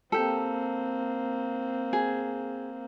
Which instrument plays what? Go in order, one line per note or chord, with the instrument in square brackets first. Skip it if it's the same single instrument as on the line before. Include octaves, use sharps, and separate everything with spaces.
[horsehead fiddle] A#3 C4 [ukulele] G4 A4
[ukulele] G#4